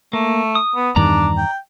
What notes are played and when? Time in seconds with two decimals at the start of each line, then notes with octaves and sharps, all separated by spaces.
0.13 A3 A#3
0.55 D#6
0.75 B3
0.96 E2 G2 D#3 D4 D5 A#5
1.37 G5